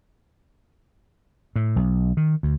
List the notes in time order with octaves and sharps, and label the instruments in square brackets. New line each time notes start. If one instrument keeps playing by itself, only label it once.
[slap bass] A2
B1
D#3
D2